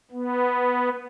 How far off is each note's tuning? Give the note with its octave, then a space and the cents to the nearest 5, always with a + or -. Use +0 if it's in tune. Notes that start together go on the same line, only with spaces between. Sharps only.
B3 +0